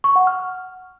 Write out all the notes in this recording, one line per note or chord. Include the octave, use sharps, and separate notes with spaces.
C#6
F#5
F6